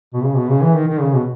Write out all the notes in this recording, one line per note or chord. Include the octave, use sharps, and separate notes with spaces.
B2
C#3
B2
C#3
E3
D#3
D#3
C#3
B2